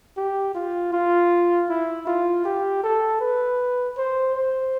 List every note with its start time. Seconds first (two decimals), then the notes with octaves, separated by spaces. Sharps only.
0.17 G4
0.55 F4
0.93 F4
1.70 E4
2.07 F4
2.45 G4
2.84 A4
3.21 B4
3.98 C5
4.35 C5